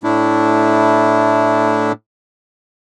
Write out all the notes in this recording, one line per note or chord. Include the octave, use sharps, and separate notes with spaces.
A2 A3 D4 E4